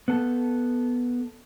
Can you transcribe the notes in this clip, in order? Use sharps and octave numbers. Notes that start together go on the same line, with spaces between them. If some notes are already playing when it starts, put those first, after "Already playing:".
B3 A4